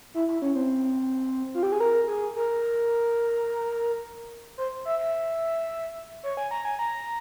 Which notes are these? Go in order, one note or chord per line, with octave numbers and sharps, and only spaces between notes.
E4
E4
C#4
C4
F4
G4
G#4
A#4
G#4
A#4
C5
E5
E5
C#5
G#5
A#5
G#5
A#5